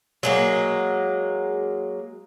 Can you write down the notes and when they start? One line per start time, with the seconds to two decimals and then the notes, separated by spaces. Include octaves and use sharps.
0.23 F#3 G#3 A#3